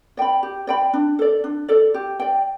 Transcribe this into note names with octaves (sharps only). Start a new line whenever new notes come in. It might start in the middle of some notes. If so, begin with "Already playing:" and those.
D5 G5 B5
G4
D5 G5 B5
D4
A4 D5
D4
A4 D5
G4
D5 G5